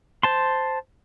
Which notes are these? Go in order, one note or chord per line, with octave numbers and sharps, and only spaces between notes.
C5 A5 C6